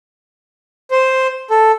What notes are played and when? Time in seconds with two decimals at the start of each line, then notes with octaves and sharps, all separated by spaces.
0.91 C5
1.50 A4